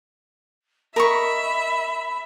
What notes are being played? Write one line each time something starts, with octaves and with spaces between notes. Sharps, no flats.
A#4 D#5 E5 B5 C#6